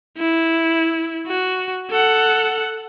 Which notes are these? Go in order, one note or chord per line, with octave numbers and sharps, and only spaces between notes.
E4
F#4
A4 F#5